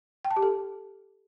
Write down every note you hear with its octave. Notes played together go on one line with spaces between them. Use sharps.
G5
A5
G4
A4